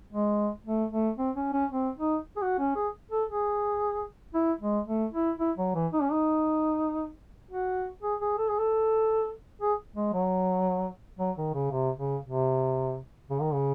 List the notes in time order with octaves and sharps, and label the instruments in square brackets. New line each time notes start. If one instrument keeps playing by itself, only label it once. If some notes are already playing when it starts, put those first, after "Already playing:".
[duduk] G#3
A3
A3
C4
C#4
C#4
C4
D#4
G#4
F#4
C#4
G#4
A4
G#4
E4
G#3
A3
E4
E4
F#3
E3
D#4
C#4
D#4
F#4
G#4
G#4
A4
G#4
A4
G#4
G#3
F#3
F#3
D#3
C#3
C3
C#3
C3
C#3
D#3
C#3